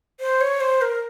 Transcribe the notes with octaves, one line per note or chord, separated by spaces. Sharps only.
C5
C#5
C5
A#4